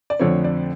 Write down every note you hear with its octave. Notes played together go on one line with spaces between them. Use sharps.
D5
F2 D3 F3 A3 C4 C#5
D5